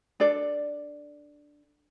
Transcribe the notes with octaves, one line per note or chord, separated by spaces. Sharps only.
D4 A4 D5